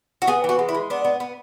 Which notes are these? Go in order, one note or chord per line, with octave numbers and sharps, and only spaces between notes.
F#4
B3 G#4
E3 F#4
G#3
E4
G#3
B3 D4
B3
B3